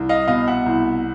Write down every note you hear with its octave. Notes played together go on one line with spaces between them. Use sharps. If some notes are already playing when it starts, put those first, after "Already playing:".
Already playing: C2
D#5 F5
B2 D#5 F5
E5 F#5
C2